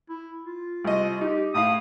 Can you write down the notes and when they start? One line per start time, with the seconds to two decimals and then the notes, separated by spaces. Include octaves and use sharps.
0.09 E4
0.45 F4
0.84 C2 D#5
1.21 D#4 G4
1.54 A2 E4 F5 D#6